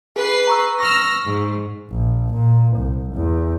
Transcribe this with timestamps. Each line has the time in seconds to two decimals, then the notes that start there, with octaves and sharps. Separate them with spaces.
0.16 G#4 B4 C7
0.47 A#5 C#6 E6
0.80 C#6 E6 F6 A#6
1.23 G#2
1.91 A#1
2.33 A#2
2.77 C2
3.14 E2